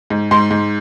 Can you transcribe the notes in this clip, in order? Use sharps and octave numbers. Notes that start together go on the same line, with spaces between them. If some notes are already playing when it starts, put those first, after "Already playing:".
G#2
G#2 C6
G#2